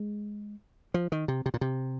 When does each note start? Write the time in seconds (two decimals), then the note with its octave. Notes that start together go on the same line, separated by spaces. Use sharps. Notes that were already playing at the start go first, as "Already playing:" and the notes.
Already playing: G#3
0.94 F3
1.12 D#3
1.28 C3
1.46 C3
1.54 A#2
1.61 C3